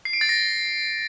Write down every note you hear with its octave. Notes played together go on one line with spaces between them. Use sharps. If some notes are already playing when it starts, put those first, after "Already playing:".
C7
D7
A6
A#6